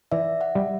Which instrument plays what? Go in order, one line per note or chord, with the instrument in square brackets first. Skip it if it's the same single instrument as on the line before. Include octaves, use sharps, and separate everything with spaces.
[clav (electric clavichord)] E3 [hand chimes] D5 E5
[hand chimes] E5 F#5
[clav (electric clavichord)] G3